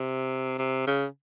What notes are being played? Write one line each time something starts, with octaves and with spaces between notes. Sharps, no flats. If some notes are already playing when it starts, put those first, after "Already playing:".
Already playing: C3
C3
C#3